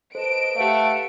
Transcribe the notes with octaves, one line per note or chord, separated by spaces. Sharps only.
A4 B4 C5 D#5 A5 D7
A3 G4 B4 F5 F#5 A5